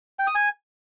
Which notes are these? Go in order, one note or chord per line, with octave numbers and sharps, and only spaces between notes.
G5
D#6
G#5